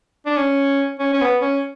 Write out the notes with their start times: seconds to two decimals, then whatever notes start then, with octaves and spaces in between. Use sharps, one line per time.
0.26 D4
0.37 C#4
1.00 C#4
1.13 C#4
1.21 B3
1.42 C#4